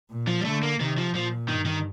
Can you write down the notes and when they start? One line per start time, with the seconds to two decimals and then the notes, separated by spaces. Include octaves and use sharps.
0.10 A#2
0.27 F3
0.41 G3
0.45 D3 A3
0.63 A#3
0.80 C3 D#3
0.98 F3
1.14 A#2 F3
1.48 G2 D#3
1.66 D#3